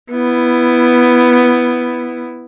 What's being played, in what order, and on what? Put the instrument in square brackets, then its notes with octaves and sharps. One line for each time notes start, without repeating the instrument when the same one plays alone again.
[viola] B3 E4